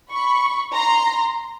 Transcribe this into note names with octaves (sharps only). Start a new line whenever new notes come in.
B5 C#6
A#5 C6